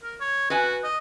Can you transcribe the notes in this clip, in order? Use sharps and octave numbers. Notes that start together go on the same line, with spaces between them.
A#4
C#5
F#4 B4 G#5
D#5